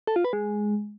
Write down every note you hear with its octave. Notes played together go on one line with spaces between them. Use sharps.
A4
F4
B4
G#3